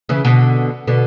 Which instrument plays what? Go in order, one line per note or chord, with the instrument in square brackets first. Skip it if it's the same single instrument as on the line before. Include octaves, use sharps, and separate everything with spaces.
[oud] C#3 E3
B2 D3
B2 D3